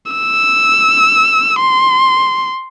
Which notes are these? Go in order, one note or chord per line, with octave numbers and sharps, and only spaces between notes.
E6
C6